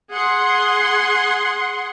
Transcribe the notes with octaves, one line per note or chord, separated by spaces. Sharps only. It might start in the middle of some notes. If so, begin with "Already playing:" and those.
G#4 F#5 C6